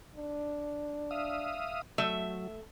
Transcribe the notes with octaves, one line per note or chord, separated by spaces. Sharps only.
D4
E5 F5 D#6
F#3 A3 E5